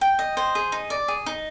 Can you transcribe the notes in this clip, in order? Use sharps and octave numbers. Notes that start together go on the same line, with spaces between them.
G5
D#5
C5
G#4
D#4
D5
G#4
D#4